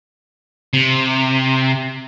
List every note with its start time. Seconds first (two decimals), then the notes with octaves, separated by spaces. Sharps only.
0.73 C3